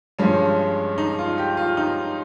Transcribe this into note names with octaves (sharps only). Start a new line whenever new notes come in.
G2 F3 G#3 C#4
D#4
F4
G4
F4
D#4